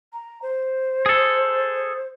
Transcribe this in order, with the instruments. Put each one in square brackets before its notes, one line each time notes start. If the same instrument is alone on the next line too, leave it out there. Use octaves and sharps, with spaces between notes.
[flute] A#5
C5
[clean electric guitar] G#4 A4